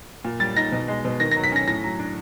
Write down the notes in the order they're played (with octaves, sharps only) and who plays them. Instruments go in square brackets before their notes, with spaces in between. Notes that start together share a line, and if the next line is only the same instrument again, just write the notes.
[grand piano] A#2
G3 A6
D#4 A#6
B2
G#3
B2
D#3 A#6
F#3 A#6
B6
C#4 A#6
A2 A#6
F#3
D4